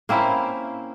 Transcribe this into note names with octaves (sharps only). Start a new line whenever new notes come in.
A#3 C4 C#4 E4